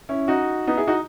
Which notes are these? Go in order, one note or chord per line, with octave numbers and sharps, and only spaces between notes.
C#4 E4
D#4 F#4
B3 D#4
E4 G#4
D#4 F#4